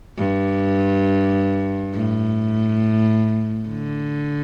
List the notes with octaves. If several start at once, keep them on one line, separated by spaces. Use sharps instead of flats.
G2
A2
D3